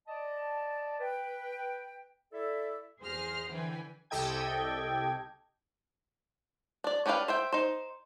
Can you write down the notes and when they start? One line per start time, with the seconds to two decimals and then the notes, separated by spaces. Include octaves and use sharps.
0.07 D5 D#5 A5
1.00 B4 G5
2.32 E4 A4 D5 E5
3.01 E2 G#4 C5 C6 F6 A#6
3.51 D3 E3 B4 G5 G#5
4.10 C2 G4 A4 D#5 G5 G#6
6.84 D4 D5
7.06 C#4 D4 G4 B4 F5
7.28 C5 E5 G5
7.52 D#4 C5